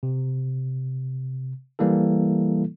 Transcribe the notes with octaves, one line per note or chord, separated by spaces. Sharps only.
C3
E3 G3 A#3 E4 A4